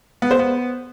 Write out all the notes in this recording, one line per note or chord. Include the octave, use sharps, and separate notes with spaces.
B3
C5
B3